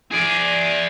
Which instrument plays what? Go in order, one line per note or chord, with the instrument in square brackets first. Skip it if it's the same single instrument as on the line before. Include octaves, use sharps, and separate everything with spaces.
[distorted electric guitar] G#4 D5